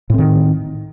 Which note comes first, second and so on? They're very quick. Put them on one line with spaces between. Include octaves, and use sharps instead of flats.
A2 C4 D#3